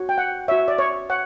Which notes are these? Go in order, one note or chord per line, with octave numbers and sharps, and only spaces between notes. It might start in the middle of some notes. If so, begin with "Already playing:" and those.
Already playing: F#4 C#5
G5
F#5
F#4 C#5 E5
D5
C#5
C#5 F#5